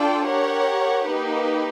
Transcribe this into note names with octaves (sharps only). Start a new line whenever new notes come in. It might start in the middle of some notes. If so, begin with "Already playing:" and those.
Already playing: D4 F4 A4 D5 G5
G4 A#4 C#5 F#5
A#3 D#4 G4 B4